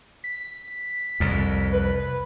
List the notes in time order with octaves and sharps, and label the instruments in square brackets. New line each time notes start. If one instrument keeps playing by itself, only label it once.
[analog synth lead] B6
[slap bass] C2 F2
[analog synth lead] B4